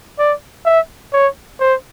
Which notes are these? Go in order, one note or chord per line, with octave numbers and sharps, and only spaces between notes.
D5
E5
C#5
C5